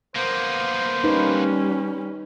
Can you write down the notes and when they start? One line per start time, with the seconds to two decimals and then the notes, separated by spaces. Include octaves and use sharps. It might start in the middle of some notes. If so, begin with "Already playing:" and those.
0.16 A#3 B3 C5
1.04 G3 C#4 D#4 B4